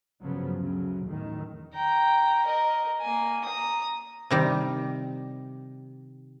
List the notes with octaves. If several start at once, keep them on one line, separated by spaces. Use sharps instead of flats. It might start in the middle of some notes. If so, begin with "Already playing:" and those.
G1 C#3 F3 F#3 B3
D2 C#3 F#3
E2 A2 D#3
G5 A#5
A#4 D#5
A#3 G#5
A#5 D#6
C3 D#3 G3